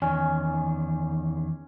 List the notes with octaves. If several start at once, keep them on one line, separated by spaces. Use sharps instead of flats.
E2 D#3 C#4 G#5